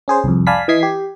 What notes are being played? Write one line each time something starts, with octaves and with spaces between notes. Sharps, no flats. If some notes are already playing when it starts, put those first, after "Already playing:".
C#4 G#4 C5
C2 F2
D5 F5 G#5 A5 B5 B6
E3 D#5 G#6 B6 C7
G4